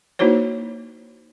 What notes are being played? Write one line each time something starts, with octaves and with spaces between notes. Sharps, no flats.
A#3 D#4 E4 F#4 C5 C#5